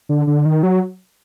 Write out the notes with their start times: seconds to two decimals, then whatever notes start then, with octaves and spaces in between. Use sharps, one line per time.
0.09 D3
0.27 D3
0.45 D#3
0.63 F#3